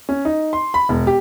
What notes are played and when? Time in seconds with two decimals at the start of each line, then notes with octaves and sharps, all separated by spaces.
0.09 C#4
0.25 D#4
0.53 C6
0.74 B5
0.89 E1
1.07 G4